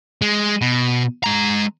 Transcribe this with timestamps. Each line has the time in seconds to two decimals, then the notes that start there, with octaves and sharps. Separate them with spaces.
0.22 G#3
0.61 B2
1.24 G#3 A#5